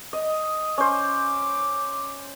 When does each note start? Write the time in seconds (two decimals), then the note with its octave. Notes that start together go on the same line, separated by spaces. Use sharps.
0.13 D#5 D#6
0.78 C#4 C5 D6